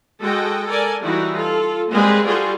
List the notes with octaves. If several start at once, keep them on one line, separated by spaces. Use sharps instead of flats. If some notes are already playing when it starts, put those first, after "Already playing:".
G#3 F#4 A4 D#5 G5
A4 A#4 D5 G#5
E3 G3 D#4 E4 F#4
F4 A4
G3 G#3 A#3 C4 G#4 B4
G3 F4 F#4 G#4 A4 C5